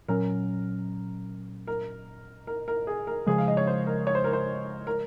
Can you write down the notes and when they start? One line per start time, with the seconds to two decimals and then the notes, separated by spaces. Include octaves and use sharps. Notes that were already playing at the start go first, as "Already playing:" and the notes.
0.08 A#2 F#3 C#4 A#4
1.67 A#4
2.47 A#4
2.68 A#4
2.87 G#4
3.07 A#4
3.27 C#3 F3 G#3 G#4
3.38 F5
3.48 D#5
3.57 C#5
3.67 C5
3.87 A#4
4.07 C#5
4.15 C5
4.24 A#4
4.33 C5
4.87 A#4